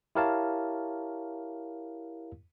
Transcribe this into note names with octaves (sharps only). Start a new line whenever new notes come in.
E4 G4 A#4 C#5 F5 A5